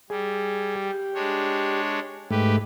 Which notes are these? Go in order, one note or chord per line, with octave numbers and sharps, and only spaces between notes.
G3 G#4
G4
G#3 D4 C#5
G#2 A3 G4 B4